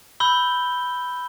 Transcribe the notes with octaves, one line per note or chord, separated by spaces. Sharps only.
B5 E6 G6 G7